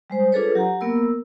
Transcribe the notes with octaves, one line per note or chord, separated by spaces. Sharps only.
G3 G#3 C5
D4 F4 G#4 A4 B4 C#5
F#3 G4 F#5 A#5
A#3 B3 A#4 E6